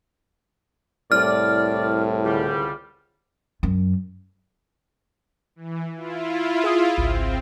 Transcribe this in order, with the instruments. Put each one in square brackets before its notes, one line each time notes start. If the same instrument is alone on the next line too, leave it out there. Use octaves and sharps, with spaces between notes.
[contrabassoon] C2 [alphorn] A2 [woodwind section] D5 [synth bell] F6
[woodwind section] C#2 D3 G3
[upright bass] F#2
[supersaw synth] E3
E4 F4
[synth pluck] G#4 F5 D#6
[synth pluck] G#1 C#2 G#2 [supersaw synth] C4